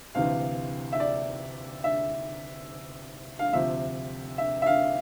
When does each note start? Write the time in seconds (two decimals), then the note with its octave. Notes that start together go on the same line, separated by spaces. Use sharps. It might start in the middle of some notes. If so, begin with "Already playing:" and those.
0.15 D2 C3 E3 F5
0.93 E5
1.00 D5
1.84 E5
3.39 F5
3.53 D2 C3 F3 E5
4.38 E5
4.62 E5
4.66 F5